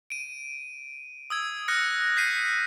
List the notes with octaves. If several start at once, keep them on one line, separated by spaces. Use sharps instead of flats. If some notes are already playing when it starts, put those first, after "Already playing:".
D7 D#7
D#6 E6 G#6
D#6 F6 F#6 A#6 C#7
G6 B6 C7 D#7